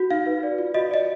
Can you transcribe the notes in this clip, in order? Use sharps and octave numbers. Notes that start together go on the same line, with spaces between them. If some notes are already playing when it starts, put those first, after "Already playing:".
Already playing: F#4
D#4 F5
B4
D5
F4
F#4 D#5
D5 D#5